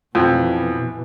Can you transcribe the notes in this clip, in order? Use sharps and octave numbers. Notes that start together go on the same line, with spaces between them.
F2 B2 E3